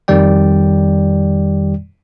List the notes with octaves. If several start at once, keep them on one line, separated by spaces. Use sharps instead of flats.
F2 D#3 G3 D5 G5